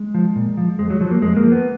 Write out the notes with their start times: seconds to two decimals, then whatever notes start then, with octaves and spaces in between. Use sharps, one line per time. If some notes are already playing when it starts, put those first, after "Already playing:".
Already playing: G#3
0.14 F3
0.36 A#2
0.57 F3
0.79 F2 G#3
0.90 F#3
1.01 F3 F#3
1.11 A#3
1.22 F2 G#3
1.37 A#3
1.43 F3
1.52 B3